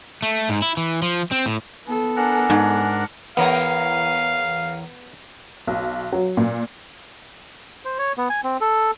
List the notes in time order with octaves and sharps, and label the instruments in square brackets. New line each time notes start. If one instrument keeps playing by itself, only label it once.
[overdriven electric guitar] A3
G#2
E4
E3
F3
C4
A2
[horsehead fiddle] B3 A4
[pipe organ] D4 A#4 F#5 [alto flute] G#5
[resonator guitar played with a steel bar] G#2
[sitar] E2 A#4 C#5 [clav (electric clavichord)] B3 [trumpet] F5
[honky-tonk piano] B1
F#3
A#2
[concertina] C5
C#5
B3
G#5
C4
A4